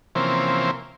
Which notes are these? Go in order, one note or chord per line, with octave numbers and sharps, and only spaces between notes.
C3 E3 F3 A#3 C4 C#4